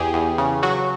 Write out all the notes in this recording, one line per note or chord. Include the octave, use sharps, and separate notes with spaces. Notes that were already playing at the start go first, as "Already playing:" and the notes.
Already playing: E2 G4 G#4
E2
C#3
F#3 F#4